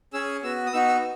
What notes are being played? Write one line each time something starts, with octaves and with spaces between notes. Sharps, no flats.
C#4 G#4 E6
B3 F#4 E6
D#6
B3 D#4 F#4 E6
E6